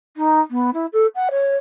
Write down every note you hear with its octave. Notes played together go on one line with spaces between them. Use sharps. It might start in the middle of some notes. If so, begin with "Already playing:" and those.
D#4
B3
E4
A4
F#5
C#5